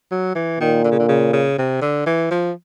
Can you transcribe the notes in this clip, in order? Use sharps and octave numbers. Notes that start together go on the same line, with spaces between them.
F#3
E3
A#2 D#3
D3
C#3
D3
C#3
C#3
C3
D3
E3
F3